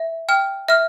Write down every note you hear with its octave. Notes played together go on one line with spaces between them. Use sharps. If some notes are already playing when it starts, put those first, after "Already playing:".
Already playing: E5
G5 F6
E5 F6